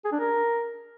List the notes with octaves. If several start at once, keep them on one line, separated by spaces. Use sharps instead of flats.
G#4
D4
A#4